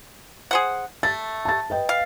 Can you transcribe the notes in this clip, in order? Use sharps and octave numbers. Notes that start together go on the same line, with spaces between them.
G#4 C5 F#5
A3 A6
A5 A6
B4 D#5 G5
F5